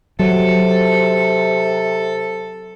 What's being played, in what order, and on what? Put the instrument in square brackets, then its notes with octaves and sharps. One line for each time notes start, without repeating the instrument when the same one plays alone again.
[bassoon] C3 [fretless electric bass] F#3 [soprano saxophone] A4